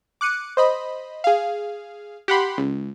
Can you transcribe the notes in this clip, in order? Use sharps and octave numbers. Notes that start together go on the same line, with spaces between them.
D6 F#6 C#7 D#7
C5 D#5 B5
G#4 F5
G4 F#5 B5 C6
C#2